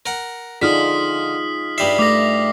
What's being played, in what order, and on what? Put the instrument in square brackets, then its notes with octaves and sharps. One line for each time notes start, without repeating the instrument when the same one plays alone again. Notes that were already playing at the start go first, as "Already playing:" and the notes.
[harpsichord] A#4 F#5
[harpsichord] D3 [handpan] D#4 F4 G#4 [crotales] D#6 F6 B6
[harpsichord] G2 G3 E5 [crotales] C7
[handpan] A3 [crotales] D6 A#6